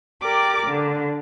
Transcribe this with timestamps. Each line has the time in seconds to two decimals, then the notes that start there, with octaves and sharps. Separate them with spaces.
0.21 G4 A#4 D5 D6
0.66 D3